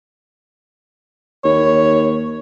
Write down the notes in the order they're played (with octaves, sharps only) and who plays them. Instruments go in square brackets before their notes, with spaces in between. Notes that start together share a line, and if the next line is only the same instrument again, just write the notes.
[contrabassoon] D#2 [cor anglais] C#5